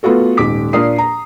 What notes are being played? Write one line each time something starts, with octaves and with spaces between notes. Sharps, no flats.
A3 B3 F4 F#4 A4
D#1 G#2 D6 B6
A#2 A#3 D4 A#4 D#6 C7
A#5